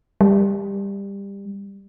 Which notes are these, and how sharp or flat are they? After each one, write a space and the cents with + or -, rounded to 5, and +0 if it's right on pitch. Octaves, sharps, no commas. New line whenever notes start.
G3 +20